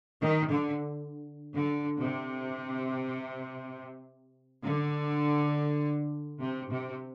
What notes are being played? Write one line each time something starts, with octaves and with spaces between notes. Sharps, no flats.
D#3
D3
D3
C3
D3
C3
C3